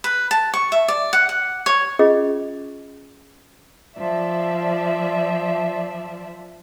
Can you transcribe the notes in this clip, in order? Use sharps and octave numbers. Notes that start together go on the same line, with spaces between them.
B4
A5
C#6
E5
D5
F#5
F#5
C#5
C#4 F4 G#4 D#5 C#6
F3 D5 E5